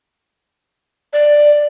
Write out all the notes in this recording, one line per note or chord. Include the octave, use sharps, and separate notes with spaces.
D5